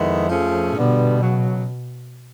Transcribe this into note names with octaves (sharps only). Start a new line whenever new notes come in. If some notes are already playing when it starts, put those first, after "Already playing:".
Already playing: F2 D#3 G#3 B3 E4
F3 A3 C#4 F4 G#4
G2 B2 D3 G3 B3
C#3 F#3